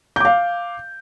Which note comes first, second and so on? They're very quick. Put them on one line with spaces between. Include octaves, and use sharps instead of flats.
G6 D6 F5